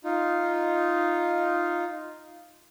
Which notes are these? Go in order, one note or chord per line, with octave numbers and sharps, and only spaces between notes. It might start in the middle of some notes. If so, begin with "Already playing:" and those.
D#4 F4